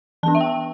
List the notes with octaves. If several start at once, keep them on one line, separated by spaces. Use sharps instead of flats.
E3 B3 D4 A5
E5
G5